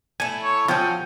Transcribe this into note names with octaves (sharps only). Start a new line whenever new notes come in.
A3 E4 G#5
C#5
F3 F#3 C#4 G5